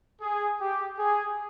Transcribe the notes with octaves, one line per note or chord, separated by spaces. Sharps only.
G#4
G4
G#4